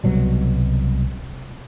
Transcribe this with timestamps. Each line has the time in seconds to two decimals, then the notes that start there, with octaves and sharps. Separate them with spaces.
0.04 C2 B2 F#3 G3